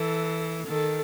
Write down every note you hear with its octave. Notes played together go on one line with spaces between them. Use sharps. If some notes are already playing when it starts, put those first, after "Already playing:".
Already playing: E3 A4
D#3 A4